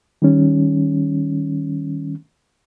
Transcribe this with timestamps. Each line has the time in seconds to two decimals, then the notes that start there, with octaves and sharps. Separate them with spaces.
0.22 D#3 G3 C#4